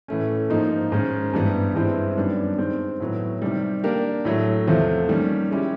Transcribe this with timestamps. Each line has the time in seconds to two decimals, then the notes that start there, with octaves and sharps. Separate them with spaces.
0.08 A2 E3 A3 C#4
0.50 G#2 F3 A#3 D#4
0.92 G#2 D#3 G#3 C#4
1.33 G2 E3 G3 B3
1.75 G2 E3 G#3 C4 E4
2.16 F#2 D#3 G3 B3 D4
2.58 D#3 G#3 C4
3.00 A2 F#3 B3
3.42 C3 D#3 G3
3.84 A#3 D4 G4 A#4
4.25 A2 F#3 A3
4.67 E2 C3 F3 A3
5.09 D#3 G3 A#3 C#4
5.51 G#3 C#4 E4 G4